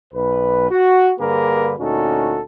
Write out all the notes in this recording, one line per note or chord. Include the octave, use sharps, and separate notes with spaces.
B1 B4
F#4
G2 D3 A#3 G#4 A#4 B4
D2 A#2 C#4 D#4 F#4 A4